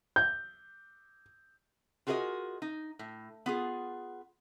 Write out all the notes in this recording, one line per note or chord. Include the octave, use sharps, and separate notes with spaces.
G6
F4 F#4 G#4 A#4 D5 D#5
D#4
A2
B3 F4 G#4